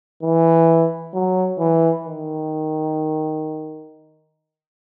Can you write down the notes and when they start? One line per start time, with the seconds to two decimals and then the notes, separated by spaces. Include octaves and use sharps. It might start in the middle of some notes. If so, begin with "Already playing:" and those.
0.23 E3
1.14 F#3
1.59 E3
2.04 D#3